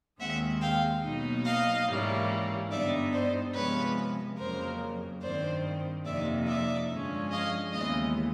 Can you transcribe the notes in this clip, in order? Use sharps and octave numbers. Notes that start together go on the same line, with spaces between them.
D#2 D#3 G#3 C4 E5 F#5
F5 G5
B2 F#3 A#3 D#4
D#5 F5
G#2 E3 G3 A#3 C#4
G2 D3 G3 B3 D#4 D5 E5
C5 D5
C3 F3 G#3 B3 B4 C#5
F2 C#3 F#3 A#3 A#4 C5
G2 D#3 G3 C4 C5 D5
F2 C3 F3 A#3 D#4 D5 E5
D5 E5
G2 D3 F3 G#3 C#4
D#5 F5
D#2 C#3 E3 G#3 B3 D#5 F5